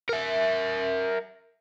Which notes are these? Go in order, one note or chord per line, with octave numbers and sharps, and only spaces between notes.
A#4 E5